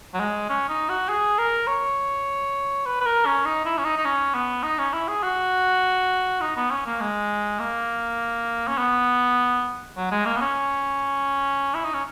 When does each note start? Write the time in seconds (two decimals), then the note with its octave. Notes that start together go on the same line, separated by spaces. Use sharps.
0.14 F#3
0.20 G#3
0.49 C#4
0.69 D#4
0.89 F#4
1.09 G#4
1.38 A#4
1.67 C#5
2.86 B4
3.00 B4
3.06 A#4
3.26 C#4
3.45 D#4
3.65 E4
3.78 C#4
3.84 D#4
3.97 D#4
4.05 C#4
4.34 B3
4.63 D#4
4.78 C#4
4.93 E4
5.08 G#4
5.23 F#4
6.41 D#4
6.56 B3
6.71 C#4
6.86 A#3
7.00 G#3
7.59 A#3
8.68 C#4
8.78 B3
9.97 F#3
10.11 G#3
10.26 A#3
10.36 B3
10.41 C#4
11.74 E4
11.85 D#4
11.93 C#4